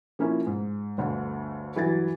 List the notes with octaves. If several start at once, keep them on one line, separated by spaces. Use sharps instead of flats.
F3 A#3 C#4 E4
G#2
G1 D2 D3
G2 E3 F#3 G#6 A6